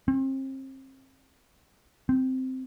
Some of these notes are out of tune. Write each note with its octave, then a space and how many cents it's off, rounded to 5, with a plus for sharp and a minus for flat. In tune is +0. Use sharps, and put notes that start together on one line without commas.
C4 +35
C4 -10